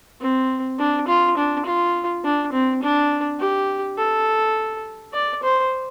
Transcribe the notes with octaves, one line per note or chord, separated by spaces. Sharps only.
C4
D4
F4
D4
F4
D4
C4
D4
G4
A4
D5
C5